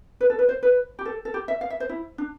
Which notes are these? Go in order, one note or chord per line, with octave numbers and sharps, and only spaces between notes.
B4
A4
B4
C5
B4
G4
A4
A4
G4
E5
F5
E5
C5
E4
D4